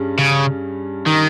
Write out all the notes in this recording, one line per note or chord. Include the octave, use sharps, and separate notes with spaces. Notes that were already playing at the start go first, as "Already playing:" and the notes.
Already playing: G2 G3 C#4 G#4
C#3
D#3